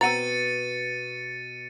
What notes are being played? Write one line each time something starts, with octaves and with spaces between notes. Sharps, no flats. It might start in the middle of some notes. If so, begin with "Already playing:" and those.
B2 C4 F#5 A#5 A6 C#7 D#7